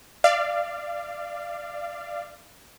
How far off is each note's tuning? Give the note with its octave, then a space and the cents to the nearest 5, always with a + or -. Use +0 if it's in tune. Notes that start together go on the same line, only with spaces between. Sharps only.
D5 +15 F5 -25